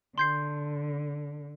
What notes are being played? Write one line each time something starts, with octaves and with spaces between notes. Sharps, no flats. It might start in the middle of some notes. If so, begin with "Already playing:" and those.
D3 C6 G6 C7